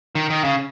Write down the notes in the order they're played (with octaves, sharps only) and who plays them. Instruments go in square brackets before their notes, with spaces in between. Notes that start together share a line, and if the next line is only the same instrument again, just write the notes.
[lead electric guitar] D#3
D#3
C#3